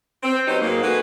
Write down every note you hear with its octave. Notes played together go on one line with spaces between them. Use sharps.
C4
F#3 B3 D#4 G4 C5
G#2 F#3 A#3
E3 D#4 F#4 A4 B4